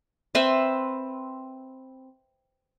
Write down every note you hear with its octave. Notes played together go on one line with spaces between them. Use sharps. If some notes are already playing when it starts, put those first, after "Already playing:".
C4 B4 E5 C6